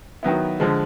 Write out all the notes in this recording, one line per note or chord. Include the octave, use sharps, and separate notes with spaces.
D#3 F#3 B3 E4
D3 F3 G#3